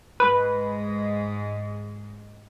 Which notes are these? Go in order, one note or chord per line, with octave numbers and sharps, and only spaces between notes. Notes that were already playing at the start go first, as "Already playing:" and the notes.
G#2 G#3 B4